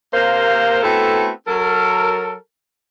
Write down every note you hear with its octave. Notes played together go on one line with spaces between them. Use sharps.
C3 A#3 C5
A3 B3 C4 E4 F#4 A4
F#3 A4 A#4